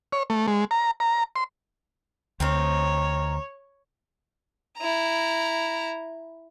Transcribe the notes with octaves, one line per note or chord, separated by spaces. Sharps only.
C#5
A3
G#3
A#5
A#5
C6
D2 C4 D#4 A#4 C#5
E4 A#5